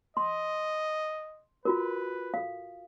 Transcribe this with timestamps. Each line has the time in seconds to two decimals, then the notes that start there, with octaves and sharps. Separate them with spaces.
0.17 D#5 C6
1.65 F4 F#4 A#4 B4
2.34 A4 F5